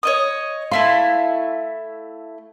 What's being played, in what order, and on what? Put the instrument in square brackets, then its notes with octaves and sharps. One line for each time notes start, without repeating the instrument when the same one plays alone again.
[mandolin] C#5 D#5 D#6
[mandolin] A3 E4 C6 [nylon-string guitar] F5